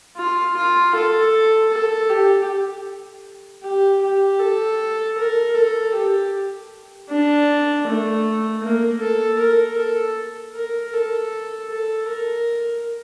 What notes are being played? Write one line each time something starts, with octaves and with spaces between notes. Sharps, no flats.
F4
F4
A4
A4
G4
G4
G4
A4
A#4
A4
G4
D4
A3
A#3
A4
A#4
A4
A#4
A4
A4
A#4